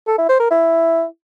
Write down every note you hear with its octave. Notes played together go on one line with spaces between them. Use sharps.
A4
E4
C5
A#4
E4